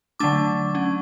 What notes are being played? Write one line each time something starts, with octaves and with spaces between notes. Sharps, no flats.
D3 F#3 A3 D4 D6
F#3 C#4